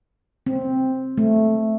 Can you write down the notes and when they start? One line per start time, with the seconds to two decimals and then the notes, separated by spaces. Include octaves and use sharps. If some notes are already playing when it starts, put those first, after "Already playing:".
0.46 C4
1.18 A3